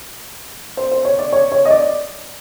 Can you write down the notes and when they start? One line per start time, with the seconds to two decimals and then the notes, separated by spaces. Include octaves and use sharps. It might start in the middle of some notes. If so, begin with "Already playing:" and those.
0.77 C5
0.91 C5
1.05 C#5
1.19 D5
1.33 C#5
1.52 C#5
1.65 D#5
1.71 D5